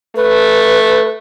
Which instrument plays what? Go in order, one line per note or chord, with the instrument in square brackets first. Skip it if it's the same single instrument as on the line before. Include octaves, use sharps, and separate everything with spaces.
[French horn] A3 [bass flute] B4